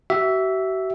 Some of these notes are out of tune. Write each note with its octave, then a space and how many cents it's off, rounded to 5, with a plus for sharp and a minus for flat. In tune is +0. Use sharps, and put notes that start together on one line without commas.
F#4 +45 E5 +0